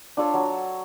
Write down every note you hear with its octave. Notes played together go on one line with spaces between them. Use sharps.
D4 F4 A4 C#5
F#3 C#5